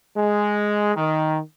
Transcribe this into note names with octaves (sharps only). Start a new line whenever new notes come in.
G#3
D#3